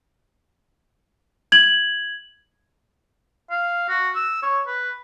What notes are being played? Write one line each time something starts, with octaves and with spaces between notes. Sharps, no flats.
G#6 F#7
F5
F#4
E6
C#5
B4